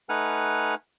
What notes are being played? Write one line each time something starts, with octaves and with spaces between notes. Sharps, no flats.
A3 D#4 B4 F#5 G#5 F6